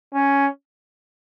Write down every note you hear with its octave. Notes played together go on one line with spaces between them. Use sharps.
C#4